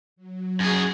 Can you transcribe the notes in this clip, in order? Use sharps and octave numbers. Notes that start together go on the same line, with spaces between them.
F#3
F#2 G#4